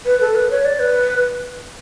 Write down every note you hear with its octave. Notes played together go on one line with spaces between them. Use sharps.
B4
A4
B4
C#5
D5
B4